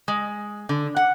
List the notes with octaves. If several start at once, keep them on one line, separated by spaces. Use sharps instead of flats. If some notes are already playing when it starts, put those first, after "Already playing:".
G#3
D3
F#5